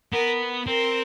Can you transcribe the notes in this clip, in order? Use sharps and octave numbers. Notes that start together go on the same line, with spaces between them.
B3 A#4
C4 A#4